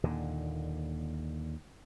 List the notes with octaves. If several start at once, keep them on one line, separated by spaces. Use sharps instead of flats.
D#2 A#2 D3